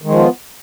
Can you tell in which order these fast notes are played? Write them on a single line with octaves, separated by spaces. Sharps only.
D#3 G#3 F3 F4 B3